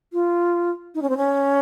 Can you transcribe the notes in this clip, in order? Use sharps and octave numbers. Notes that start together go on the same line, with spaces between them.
F4
D#4
C#4
C4
C#4